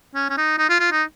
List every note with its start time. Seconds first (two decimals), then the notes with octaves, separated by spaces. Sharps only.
0.15 C#4
0.30 C#4
0.37 D#4
0.58 D#4
0.70 F4
0.80 F4
0.92 D#4